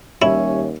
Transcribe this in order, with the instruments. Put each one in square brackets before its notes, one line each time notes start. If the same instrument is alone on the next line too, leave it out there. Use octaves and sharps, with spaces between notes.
[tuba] D#2 [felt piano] G3 E5 [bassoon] C#4 [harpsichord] E4